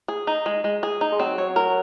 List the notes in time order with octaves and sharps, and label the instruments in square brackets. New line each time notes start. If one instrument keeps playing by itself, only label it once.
[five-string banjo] G#4
D#4
G#3
G#3
G#4
D#4
[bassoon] G#3
[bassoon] F#3 [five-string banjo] C4
[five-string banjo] C#5
A#4